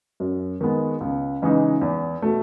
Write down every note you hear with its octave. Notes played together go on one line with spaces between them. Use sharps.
F#2
D#3 G#3 B3
C#2
C#3 E3 G#3 D#4
E2
B2 A3